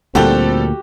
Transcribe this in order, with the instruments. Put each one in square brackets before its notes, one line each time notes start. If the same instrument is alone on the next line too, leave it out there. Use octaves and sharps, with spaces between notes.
[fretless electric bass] D2 A#2 [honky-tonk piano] G3 A4 [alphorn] C4 [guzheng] F#4 G4